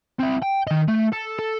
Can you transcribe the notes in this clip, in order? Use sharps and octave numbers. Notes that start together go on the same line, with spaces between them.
C4 E4
G5
D#3 D#5
A3
A4
A4